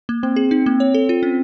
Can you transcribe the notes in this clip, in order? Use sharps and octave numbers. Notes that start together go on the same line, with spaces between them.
A#3
A#3 C4
G#4
D#4
A#3
C#5
A4
F4
C#4